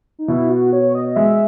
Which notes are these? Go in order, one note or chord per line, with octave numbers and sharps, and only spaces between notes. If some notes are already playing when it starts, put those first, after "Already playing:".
D#4
B2 E4
F#4
C#5
D#5
D#5
G#3 E5